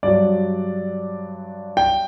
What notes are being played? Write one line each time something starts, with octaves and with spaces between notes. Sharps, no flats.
G2 F#3 D5
G5